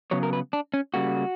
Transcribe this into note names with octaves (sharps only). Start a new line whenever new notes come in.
C#3 F#3 B3 C#5
A#4
B4
D4
C#4
C#3 G3 A#3 F#4